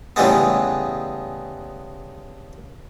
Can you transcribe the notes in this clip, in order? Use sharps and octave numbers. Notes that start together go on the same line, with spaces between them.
A2 C#3 E3 G3 G#3 B3